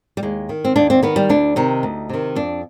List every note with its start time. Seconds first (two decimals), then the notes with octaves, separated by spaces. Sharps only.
0.17 G3
0.23 D#2 G#3
0.49 D#3
0.65 C4
0.76 D#2 D4
0.90 C4
1.03 D#3 B3
1.16 G3
1.29 D2 D4
1.56 C3 D#3 D#4
1.83 D2
2.09 C3 D#3
2.36 F2 D4